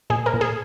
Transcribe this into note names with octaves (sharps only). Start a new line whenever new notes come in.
A#2 G#4
A#4
A#2
G#4